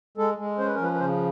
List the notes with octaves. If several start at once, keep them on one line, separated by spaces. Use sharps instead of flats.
G#3 A4
G#3
C#4 C5
B4
F3 A#4
B4
B4
C#3 C5